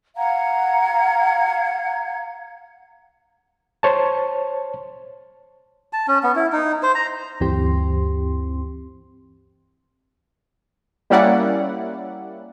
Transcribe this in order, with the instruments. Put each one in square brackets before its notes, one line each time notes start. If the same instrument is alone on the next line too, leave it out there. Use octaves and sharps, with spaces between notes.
[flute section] F5 F#5 A#5 G#6
[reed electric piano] C5 C#5 A5
[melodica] A5
C#4
B3
E4
D#4
C5
A#5
[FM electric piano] D2 G2 E3 C4 G4 C6
[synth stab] G3 A#3 C#4 E4 D5 F#5